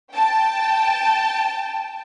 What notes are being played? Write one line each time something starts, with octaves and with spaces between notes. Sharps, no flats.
G5 A5